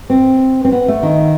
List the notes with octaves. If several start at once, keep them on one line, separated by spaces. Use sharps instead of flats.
C4
C4
B3
A3
D#3